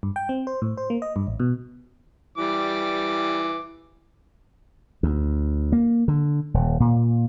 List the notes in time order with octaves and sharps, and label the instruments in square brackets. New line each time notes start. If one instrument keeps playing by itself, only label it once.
[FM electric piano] G2
G5
C4
C5
A2
C5
A#3
D#5
G2
A1
B2
[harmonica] E3 G3 D6
[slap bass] D2
A#3
D3
D#1
A#2